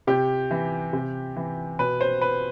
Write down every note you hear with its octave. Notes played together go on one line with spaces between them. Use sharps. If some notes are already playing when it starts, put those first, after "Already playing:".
C3 G4
E3
C3
E3
B2 B4
C5
B4